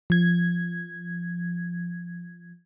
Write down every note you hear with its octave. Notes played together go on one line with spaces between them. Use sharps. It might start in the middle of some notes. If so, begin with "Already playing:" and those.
F3 G#6